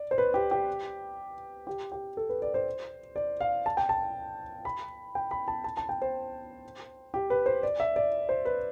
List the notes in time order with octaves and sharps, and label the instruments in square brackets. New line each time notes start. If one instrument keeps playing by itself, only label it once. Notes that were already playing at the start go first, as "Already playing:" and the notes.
Already playing: [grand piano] D5
C5
B4
G4
G4
G4
G4
A4
B4
D5
C5
D5
F5
A5
G5
A5
B5
G5
B5
A5
A5
A5
G5
C5
G4
B4
C5
D5
E5
D5
C5
B4